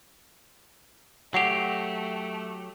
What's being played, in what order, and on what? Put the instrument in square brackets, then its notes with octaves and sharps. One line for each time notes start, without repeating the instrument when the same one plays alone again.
[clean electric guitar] F#3 G4 [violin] A3 [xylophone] F#5 C7 F7